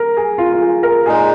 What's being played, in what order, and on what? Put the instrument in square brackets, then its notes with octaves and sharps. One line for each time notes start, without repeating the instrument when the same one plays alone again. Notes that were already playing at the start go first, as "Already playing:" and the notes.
Already playing: [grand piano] A#4
G#4
F4
F4
G#4
A#4
[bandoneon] A#2 G#3 D#4 [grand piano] G#4